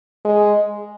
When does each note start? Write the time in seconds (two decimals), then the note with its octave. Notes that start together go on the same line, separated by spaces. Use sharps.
0.25 G#3